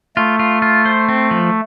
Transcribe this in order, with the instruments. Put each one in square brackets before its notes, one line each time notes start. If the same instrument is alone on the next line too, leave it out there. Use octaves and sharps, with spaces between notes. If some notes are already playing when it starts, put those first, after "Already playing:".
[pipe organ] A3 [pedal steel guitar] F4
[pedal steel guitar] F4
F4
C5
C4
F3